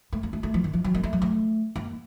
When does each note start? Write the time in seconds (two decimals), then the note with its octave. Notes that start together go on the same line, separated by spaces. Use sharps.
0.13 A3
0.23 A#3
0.33 A3
0.43 A3
0.54 F3
0.64 D#3
0.73 F3
0.84 F#3
0.94 A#3
1.03 A3
1.13 F#3
1.22 A3
1.76 A#3